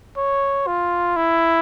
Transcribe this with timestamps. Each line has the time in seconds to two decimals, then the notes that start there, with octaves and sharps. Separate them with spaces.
0.17 C#5
0.67 F4
1.17 E4